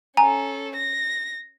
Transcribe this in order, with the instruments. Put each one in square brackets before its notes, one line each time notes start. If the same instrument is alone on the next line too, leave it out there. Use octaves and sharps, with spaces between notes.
[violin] C#4 A4 [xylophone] G#5 A#5
[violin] A#6